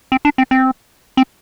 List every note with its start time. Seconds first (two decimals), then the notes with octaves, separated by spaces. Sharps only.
0.12 C4
0.25 D4
0.38 C4
0.51 C4
1.17 C4